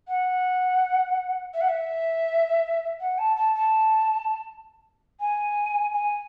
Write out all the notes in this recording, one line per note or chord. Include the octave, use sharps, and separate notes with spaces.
F#5
E5
F#5
E5
F#5
A5
A5
A5
G#5
G#5